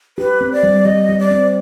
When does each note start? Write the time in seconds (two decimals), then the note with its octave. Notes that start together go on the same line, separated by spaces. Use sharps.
0.18 G4 B4
0.41 C4
0.52 D5
0.63 G3
0.85 G3 D#5
1.09 G3
1.19 D5
1.31 C4